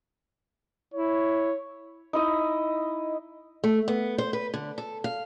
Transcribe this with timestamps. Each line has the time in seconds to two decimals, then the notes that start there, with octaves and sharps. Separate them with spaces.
0.94 E4 C#5
2.13 D#4 E4 D#5
3.64 A3
3.88 B3
4.18 C5
4.33 B4
4.54 D3
4.78 A4
5.04 F5